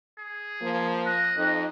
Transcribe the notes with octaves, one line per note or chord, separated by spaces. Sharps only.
G#4
F3 A#3
D#5 F#6
F2 D#4 D#5